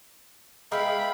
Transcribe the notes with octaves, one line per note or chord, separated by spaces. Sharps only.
G#3 A3 B3 E5 F5 G5 B5